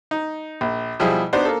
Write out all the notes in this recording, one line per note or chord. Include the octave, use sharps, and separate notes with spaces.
D#4
A#1
B2 F3 G3 E4 G#4
B3 D4 D#4 F#4 C5
A#3 A4